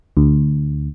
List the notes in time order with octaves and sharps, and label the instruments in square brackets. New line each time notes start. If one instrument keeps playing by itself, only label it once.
[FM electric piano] D2